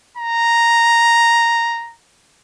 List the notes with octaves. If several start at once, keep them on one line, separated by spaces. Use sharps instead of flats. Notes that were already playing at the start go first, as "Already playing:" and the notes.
A#5